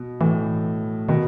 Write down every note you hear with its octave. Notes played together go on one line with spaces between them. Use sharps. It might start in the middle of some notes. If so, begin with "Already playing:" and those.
Already playing: B2
A2 E3
B2 D#3